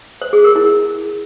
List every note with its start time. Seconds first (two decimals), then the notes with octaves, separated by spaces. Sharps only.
0.22 C5
0.33 G#4
0.44 A#4
0.56 E4